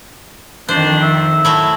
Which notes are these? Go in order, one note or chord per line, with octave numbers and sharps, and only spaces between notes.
F2 D#3 D4 C5
E5
F#3 A3 E4